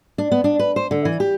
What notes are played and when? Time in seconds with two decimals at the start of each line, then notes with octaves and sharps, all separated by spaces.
0.18 D4
0.31 B3
0.44 D4
0.59 B4
0.76 C5
0.91 D3
1.05 E3
1.20 G4